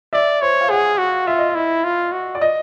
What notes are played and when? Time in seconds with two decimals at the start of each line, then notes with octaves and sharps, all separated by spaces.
0.13 D5 E5
0.42 C5 C#5
0.61 F5
0.70 G#4 F#5
0.98 F#4
1.27 F4 E5
1.39 D#5
1.49 E5
1.55 E4
1.84 F4
2.12 F#4
2.35 D5
2.41 D#5